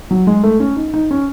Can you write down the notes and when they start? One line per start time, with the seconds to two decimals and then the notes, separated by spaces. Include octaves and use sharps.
0.11 F#3
0.27 G#3
0.44 A3
0.60 C#4
0.76 D#4
0.94 D#4
1.11 C#4